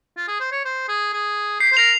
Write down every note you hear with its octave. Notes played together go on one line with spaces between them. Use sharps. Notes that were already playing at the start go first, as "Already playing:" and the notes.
F4
G#4
C5
C#5
C5
G#4
G#4
G4 C7
C5
A#4 F7